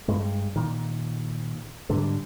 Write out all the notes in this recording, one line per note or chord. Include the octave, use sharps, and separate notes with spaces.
G2 G#3
A#2 D#3
G#2 D3 G3